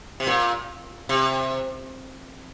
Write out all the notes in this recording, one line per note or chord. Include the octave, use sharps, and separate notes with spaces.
C3
A#2
C3